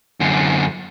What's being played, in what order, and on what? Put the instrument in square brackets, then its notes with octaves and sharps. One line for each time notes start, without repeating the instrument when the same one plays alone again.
[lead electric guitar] F#2 D3